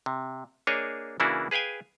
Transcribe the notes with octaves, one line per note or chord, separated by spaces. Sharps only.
C3
A#3 D4 G#4 C#5 D#5
C#3 E3 A#3 D4 E4 F#4
G#4 B4 F5 G5 G#5